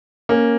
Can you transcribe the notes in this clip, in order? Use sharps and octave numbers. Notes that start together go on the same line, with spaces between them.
A#3 C#4